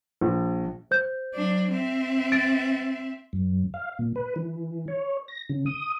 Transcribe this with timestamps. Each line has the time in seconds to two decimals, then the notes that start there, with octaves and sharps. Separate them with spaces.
0.21 A#1
0.91 C5 G6
1.34 F#3 D4
1.72 C4 E5
2.32 A6 D7
3.33 F#2
3.74 F5
3.99 A#2
4.16 B4
4.36 E3
4.88 C#5
5.28 A#6
5.50 C#3
5.66 D#6